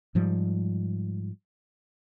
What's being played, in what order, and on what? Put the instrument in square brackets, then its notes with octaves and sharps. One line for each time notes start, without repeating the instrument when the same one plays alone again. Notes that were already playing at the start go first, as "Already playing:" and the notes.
[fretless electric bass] G#2 F3 G3